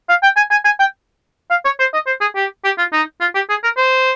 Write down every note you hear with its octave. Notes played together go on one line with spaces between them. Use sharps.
F5
G5
G#5
G#5
G#5
G5
F5
C#5
C5
D#5
C5
G#4
G4
G4
F4
D#4
F4
G4
G#4
A#4
C5